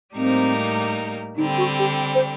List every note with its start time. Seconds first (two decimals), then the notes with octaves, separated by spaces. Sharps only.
0.15 A2 G3 A#3 C4 D#4
1.37 D3 G3 C4 D#4
1.58 F#4
1.79 G4
2.15 C5